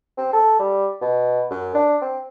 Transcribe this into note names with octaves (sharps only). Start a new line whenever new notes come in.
C4
A4
G3
B2
F#2
D4
C4